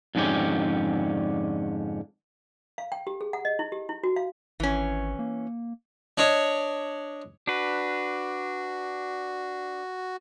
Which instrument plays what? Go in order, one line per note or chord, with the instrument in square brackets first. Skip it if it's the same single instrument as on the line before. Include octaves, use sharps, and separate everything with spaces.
[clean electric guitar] F2 G#2 D3 C#4 G4
[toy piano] F5
G5
G4
G#4
F#5
D#5
E4
G4
E4
F#4
F5
[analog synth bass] G#1 [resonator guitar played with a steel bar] E3 C#4
[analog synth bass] A#3
[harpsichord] D4 C#5 D#5
[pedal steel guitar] D4 B4 [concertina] F#4